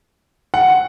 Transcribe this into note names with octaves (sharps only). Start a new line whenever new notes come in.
F#5